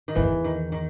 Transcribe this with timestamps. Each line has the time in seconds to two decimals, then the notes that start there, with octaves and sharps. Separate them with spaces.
0.08 D#3
0.15 E2 E3
0.44 D#3
0.72 D#3